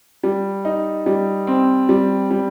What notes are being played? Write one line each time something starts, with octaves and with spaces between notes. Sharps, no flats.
G3
D#4
G3
C4
G3
G3